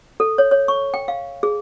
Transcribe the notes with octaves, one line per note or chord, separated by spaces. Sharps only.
A4
C#5
C#5
C#6
G5
F5
G#4